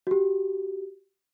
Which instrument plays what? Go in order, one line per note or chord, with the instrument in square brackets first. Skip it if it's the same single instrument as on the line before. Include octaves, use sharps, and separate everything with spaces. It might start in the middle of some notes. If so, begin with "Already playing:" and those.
[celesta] F#4 G4